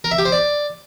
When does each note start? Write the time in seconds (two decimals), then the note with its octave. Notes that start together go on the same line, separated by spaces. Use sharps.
0.04 A#4
0.11 E5
0.18 G4
0.25 C5
0.32 D5